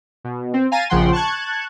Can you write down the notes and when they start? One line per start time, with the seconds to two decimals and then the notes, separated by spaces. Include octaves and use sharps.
0.24 B2
0.54 C4
0.71 F5 G#5 A#5 A6 D#7
0.90 A#1 C#3 F3 F#5 G5 C6
1.13 A5 C#6 F#6 G#6